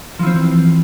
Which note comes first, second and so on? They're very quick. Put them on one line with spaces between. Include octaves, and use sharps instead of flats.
F3 E3 C4